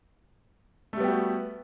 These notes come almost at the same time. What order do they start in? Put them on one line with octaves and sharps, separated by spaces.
A3 G3 B3 G4 F#4